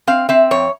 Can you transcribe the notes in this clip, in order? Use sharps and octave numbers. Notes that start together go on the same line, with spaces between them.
C4 F5
C4 E5
F2 C#5